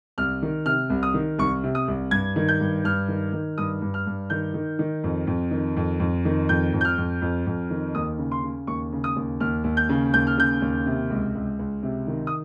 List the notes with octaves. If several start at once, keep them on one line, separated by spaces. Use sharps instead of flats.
C2 F6
D#3
C3 F6
C2
D#6
D#3
C2 C#6
C3
D#6
C2
G2 G#6
D#3
G6
G2
G2 F6
D#3
D#3
G2 D#6
G2
F6
G2
D#3 G6
D#3
D#3
F2
F2
D#3
F2
F2
D#3
F2 G6
F2
G6
F6
F2
F2
F2
D#3
D#2 D#6
C#3
C6
C#3
D#2 C#6
C#3
D#6
D#2
D#2 F6
D#2
G6
C#3
D#2 G6
F6
C#3 G6
D#2
C3
C#2
C#2
C#2
C3
D#3
D#6